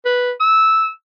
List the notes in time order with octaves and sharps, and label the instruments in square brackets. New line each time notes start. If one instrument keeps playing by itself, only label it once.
[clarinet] B4
E6